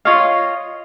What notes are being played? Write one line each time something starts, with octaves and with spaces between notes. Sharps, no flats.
F4 C#5 D#5 F5